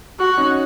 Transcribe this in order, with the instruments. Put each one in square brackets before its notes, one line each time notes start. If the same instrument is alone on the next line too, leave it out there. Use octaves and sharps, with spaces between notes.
[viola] F#4
[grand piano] C#4 D#4